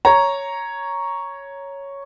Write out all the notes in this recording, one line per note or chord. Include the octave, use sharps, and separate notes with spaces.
C#5 A#5